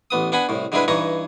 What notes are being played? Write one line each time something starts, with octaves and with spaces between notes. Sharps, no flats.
A1 B3 D#6
B3 D4 F#5 G#5 B5
C2 A2
D3 G3 G#3 D4 E4 B4
G2 E3 D#4 C#5 A#5 C#6